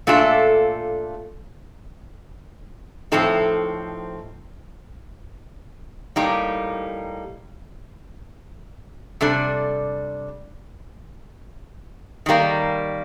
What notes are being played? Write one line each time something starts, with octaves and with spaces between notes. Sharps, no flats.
A#2 A3 D4 F4 A4
A2 F3 C4 D#4 A4
A2 G3 A#3 D#4 G4
C3 G3 D4 A4
D#3 G3 A#3